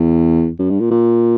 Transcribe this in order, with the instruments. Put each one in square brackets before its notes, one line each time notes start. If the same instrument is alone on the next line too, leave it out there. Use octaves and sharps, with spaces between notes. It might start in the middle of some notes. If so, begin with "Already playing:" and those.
Already playing: [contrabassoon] E2
F#2
G2
A#2
A#2